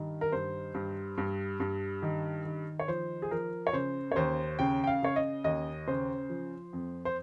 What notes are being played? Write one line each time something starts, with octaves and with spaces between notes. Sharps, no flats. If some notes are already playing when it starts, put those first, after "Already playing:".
Already playing: G2 D#3
A#4
G2 C5
G2
G2
G2
D#3
D#3
C#5
F3 C5
G#4
F3 A#4
C#5
C#3 C5
C#5
D#2 C5
C#3 G5
G5
F5
C#3 C#5
D#5
D#2 D#5
C#3 C5
F3
F2
C5